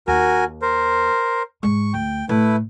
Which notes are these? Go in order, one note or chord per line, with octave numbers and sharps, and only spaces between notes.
D#2 F#4 A#4 G#5
A#4 C5
G#2 G#3 C#6
D2 G5
A2 A3 E4 B4